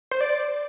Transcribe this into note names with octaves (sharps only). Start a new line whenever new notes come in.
C5
D5